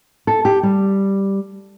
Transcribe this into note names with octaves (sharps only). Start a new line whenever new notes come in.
A4
G4
G3